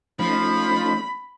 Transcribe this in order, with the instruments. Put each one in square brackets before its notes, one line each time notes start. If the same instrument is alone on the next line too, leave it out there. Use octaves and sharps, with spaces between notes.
[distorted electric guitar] F3 [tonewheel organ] A3 C#4 D#4 [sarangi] B5